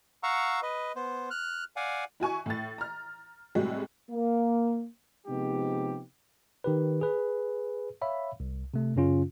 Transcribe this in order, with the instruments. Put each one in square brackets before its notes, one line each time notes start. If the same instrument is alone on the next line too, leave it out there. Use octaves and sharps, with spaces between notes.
[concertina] F5 F#5 A#5 C#6 E6
B4 D#5
B3 C5
F6 F#6
D5 F5 F#5 G#5
[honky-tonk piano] E4 F#4 G#5 C#6
A2 A6
A#5 F6
A2 C3 G3 G#3 F#4
[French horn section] A#3
[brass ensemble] C3 F3 G#3 B3 D#4 G4
[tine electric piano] D#3 G4 B4
G#4 B4
C#5 E5 F5 B5
C2
C3 A3
F#2 C#3 C#4 F4